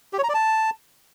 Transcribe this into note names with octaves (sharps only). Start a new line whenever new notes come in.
G4
C#5
A#5
D5
A5